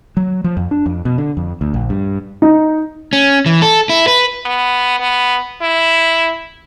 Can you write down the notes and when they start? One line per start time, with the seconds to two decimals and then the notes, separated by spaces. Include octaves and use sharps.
0.17 F#3
0.44 F3
0.57 F2
0.71 D4
0.86 F2
1.05 B2
1.18 D3
1.37 F2
1.61 D2
1.74 A#1
1.90 G2
2.42 D#4
3.13 C#4
3.46 E3
3.62 A4
3.89 E4
4.08 B4
4.45 B3
5.00 B3
5.62 E4